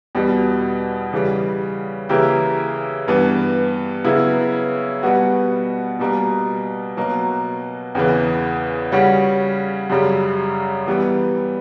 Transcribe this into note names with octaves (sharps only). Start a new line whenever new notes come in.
E2 B2 G3
C#3 E3 G3
C#3 E3 A#3 E4 G4
G2 E3 B3
C#3 F#3 B3 E4
B2 G3 B3 F#4
B2 G3 A#3
B2 F#3 A#3
E2 C#3 E3
C#3 G3 C#4 F#4
F#2 C#3 G3
E3 G3 B3